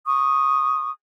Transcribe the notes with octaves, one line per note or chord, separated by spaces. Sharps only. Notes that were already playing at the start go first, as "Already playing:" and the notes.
C#6 D#6